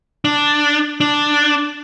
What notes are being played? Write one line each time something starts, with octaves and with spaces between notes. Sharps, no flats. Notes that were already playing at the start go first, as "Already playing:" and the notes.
D4
D4